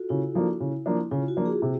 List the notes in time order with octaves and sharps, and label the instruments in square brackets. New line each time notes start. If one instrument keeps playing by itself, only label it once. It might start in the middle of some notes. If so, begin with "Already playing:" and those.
Already playing: [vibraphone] F4 F#4 A4
[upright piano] C#3 [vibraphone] E4
[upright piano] F3 A#3 D4
C#3
F3 A#3 D4
[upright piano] C#3 [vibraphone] F4
[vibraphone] F#4
[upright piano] F3 A#3 D4
[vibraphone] G#4
[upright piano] C3